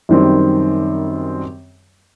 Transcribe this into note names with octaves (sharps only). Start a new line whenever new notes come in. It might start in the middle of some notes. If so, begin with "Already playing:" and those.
F#2 D#3 G3 C4